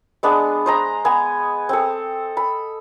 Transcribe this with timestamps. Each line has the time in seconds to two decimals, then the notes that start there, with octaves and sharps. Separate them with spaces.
0.23 G#3 B3 D4
0.66 C5 D#5 A#5
1.05 B3 G#5
1.69 C4 A4
2.37 B5